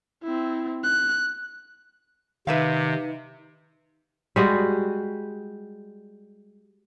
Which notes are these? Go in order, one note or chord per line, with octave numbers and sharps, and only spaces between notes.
C4 E4
F#6
C3 D#3 D#4 B4 E5 F5
G3 G#3 F#4